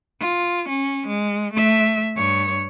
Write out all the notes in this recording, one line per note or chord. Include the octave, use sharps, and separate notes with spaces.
F4
C#4
G#3
A3 E5
G2 C#5